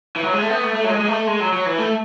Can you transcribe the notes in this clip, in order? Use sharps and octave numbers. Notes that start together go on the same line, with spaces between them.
E3
F#3
G#3
A3
B3
A3
A3
F#3
G#3
G#3
A3
G#3
F#3
F#3
E3
A3